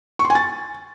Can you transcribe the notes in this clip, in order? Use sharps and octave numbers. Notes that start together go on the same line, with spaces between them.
C#6
C6
G#5
A6